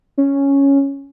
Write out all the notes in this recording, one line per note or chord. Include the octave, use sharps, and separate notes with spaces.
C#4